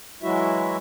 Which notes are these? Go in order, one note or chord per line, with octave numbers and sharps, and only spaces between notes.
E3 F#3 G#3 E4 F#4 E5